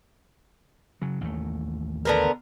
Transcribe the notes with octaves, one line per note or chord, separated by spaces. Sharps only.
C#3 F#3
A1 D#2 A3
D3 B3 A#4